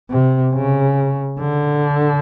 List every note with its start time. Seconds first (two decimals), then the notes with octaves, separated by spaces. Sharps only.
0.10 C3
0.54 C#3
1.40 D3